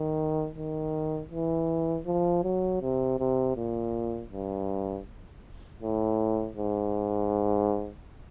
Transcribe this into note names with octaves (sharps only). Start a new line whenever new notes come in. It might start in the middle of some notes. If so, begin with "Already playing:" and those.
Already playing: D#3
D#3
E3
F3
F#3
C3
C3
A#2
G2
A2
G#2